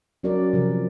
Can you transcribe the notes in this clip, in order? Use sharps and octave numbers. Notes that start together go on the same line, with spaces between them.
F#3 C#4 F#4 A#4 D5
C3 F3 A#4